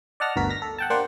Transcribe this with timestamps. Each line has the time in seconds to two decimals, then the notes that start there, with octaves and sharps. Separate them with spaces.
0.20 D5 D#5 F#5 A5 F6 A#6
0.36 G1 D2 B2 F#4 A#4 B6
0.50 F6 A#6 B6
0.62 A4
0.78 F#5 G5 A5
0.90 A#3 D4 G4 C5 F#5 G5